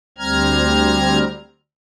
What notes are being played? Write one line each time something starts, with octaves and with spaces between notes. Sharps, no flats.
D2 G3 C4 A#5 F6 G#6